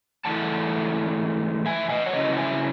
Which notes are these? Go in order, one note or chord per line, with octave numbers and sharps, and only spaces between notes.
G#2 E3 A3 E4 F#5 A5
E5 G#5
D#5 F#5
C#5
C#3 F#3 C#4 E4 B4 D#5
F#5
E5 G#5